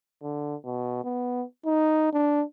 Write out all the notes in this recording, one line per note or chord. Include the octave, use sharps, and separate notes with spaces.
D3
B2
B3
D#4
D4